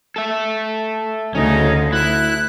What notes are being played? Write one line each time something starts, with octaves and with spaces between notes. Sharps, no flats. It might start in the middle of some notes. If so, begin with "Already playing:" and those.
A4 E5
D2 C#3 C#4 D#4
E4 F#6